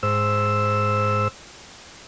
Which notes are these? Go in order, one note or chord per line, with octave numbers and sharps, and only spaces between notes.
G#2 C5 E6